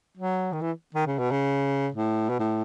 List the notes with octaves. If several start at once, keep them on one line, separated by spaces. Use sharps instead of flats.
F#3
D#3
E3
D#3
C#3
B2
C#3
A2
B2
A2